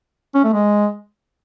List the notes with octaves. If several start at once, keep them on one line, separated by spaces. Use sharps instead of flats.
C#4
A3
G#3